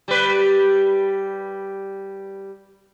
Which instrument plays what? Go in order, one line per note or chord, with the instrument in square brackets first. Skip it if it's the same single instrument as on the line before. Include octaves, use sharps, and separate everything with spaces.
[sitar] G3 B4